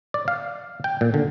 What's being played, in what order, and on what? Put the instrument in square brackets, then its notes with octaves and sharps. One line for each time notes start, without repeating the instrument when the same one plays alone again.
[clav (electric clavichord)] D5
F5
G5
A#2
D3